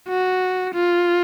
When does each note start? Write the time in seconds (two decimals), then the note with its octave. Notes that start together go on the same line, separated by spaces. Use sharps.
0.08 F#4
0.74 F4